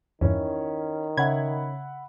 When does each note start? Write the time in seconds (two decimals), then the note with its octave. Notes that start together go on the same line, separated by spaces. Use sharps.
0.21 E2 G2 D#3 C#4 E4
1.17 C#3 E5 F#5 B5 G#6